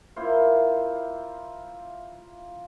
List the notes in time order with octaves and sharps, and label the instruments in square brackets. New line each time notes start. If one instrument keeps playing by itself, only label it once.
[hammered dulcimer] A#3 E4 F4 C5